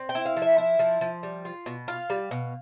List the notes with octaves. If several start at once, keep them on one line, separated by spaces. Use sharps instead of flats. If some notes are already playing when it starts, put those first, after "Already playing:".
Already playing: C4
G5
E4
F5
F3
E5
E4
F3
F3
G3
F4
B2
F4 F5
G3
B2